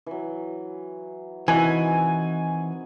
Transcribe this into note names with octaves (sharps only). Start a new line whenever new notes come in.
E3 F#3
C3 D#3 E3 F#4 G#5